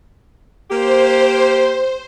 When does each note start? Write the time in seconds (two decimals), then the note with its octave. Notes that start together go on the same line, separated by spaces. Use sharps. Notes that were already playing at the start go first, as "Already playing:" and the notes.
0.71 A#3 G4 C5